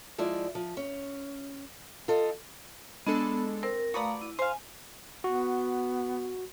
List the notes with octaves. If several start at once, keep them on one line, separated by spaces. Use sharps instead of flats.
F3 G#3 E4 D5
F3
C#4
F4 A4 D#5
G#3 B3 D4 A4
C4 A#4
A3 F#4 B4 D5 F5 A#5 D#6
E4 D#7
C5 F5 G#5
B3 F#4